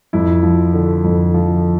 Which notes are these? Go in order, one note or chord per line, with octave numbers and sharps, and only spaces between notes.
F2 E4
F3
D3
F2
F3